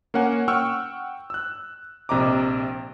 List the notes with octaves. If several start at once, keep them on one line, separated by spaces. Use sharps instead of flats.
A#3 C#4 F#5 G#5
F#5 G5 C#6 E6 F6
E6 F#6
A#1 C3 D#5 A#5 D6